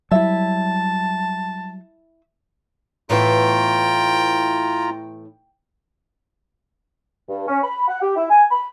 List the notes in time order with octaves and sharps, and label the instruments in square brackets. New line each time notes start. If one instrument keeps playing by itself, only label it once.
[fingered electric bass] F#3 G3 [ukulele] E4 E5 [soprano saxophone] A5
[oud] A2 E3 B3 [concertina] F4 A#5 [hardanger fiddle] G5
[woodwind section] G2
C#4
B5
F#5
G4
E4
G#5
B5